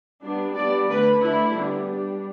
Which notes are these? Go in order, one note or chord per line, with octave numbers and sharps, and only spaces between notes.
G3 B3 D4
G3 B3 D4 D5
D3 A3 D4 B4
D3 A3 D4 E4
G3 B3 D4
G3 D4